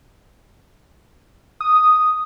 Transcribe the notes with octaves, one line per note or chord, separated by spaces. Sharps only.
D#6